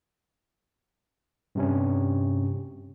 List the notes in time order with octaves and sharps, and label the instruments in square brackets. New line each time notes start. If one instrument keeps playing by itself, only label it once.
[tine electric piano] G2 C3 C#4